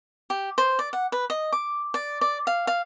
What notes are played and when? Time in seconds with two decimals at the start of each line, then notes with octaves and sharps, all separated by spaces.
0.30 G4
0.58 C5
0.79 D5
0.93 F#5
1.12 B4
1.30 D#5
1.53 D6
1.94 D5
2.21 D5
2.47 F5
2.67 F5